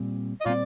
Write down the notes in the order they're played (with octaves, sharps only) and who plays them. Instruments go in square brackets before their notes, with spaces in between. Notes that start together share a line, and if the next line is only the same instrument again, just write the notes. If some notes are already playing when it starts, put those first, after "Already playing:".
Already playing: [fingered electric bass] A#2 G3 C4
[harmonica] D#5
[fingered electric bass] A#2 G3 C4 [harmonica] F4 D5